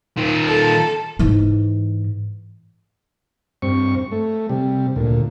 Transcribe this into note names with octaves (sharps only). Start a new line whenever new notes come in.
D#3 F4
A4
G#2 E3
G2 C4 C#6
A3
C3 G3
D2 A#2